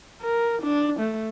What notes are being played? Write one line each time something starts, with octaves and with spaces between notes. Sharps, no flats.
A#4
D4
A3